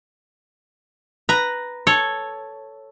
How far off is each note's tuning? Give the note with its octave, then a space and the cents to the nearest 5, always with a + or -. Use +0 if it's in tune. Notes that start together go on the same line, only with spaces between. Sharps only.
B4 +0 A#5 +0
A4 +0 C#5 +0